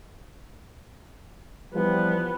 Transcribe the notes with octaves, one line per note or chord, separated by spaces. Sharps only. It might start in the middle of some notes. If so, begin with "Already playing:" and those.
E3 F3 G3 B3